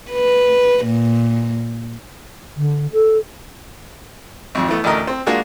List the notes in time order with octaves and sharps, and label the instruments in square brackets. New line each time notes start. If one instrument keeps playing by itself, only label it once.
[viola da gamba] B4
A#2
[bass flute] D3
A4
[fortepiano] G#1 F2
E3 A3 B3
A1 D2 A3 A#4 D#5 A#5
C4
G#3 A#3 D4 F4 F#4 G#4